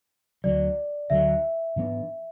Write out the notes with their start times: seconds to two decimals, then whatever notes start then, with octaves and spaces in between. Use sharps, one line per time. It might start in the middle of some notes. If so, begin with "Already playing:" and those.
0.44 D2 D3 F#3 D5
1.10 D2 D3 F#3 E5
1.76 G#2 E3 B3 D4